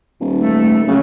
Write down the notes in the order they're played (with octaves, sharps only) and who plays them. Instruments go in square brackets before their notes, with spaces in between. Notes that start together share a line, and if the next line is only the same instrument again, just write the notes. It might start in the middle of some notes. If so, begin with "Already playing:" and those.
[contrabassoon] D#1
[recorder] A3
[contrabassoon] C#3 [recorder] F#3